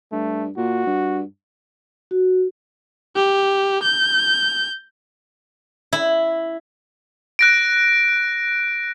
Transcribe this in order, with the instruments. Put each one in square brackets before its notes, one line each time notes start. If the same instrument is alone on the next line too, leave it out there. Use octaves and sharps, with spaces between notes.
[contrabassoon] G2 [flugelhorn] A3
[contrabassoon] A#2 [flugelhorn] F#4
[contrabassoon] G2
[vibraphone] F#4
[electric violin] G4
G6
[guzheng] E4
[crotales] F#6 A#6 D7